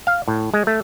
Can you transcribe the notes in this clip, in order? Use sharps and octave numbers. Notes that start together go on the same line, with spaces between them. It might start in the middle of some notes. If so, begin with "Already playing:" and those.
F5
A2
G#3
A3